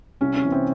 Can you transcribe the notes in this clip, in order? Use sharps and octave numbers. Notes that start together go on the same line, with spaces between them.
C2 C#4
C#4
C3 E3
C4